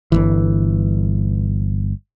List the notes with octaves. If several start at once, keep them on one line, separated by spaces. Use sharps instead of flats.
G1 C2 E3